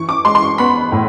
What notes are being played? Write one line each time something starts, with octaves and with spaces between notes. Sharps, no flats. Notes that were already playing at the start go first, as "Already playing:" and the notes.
Already playing: E3 C#6
D6
G#3 C6
C6
C#6
B3 B5
A2